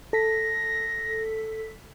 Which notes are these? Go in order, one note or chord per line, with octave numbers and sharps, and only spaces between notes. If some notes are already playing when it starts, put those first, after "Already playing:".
A4 A#6 B6